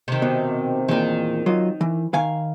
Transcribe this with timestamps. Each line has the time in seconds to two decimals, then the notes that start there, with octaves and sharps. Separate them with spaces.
0.08 C3 D#3
0.22 B2
0.88 E2 A#2 D#3
1.46 F#3 F4 D#5
1.81 E3
2.13 D#3 F5 G#5